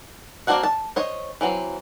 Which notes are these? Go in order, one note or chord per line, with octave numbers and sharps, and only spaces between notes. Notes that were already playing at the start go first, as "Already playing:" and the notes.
A#3 C4 D4 F#4 F#5
A5
C5 C#5 D#5
E3 F#3 C4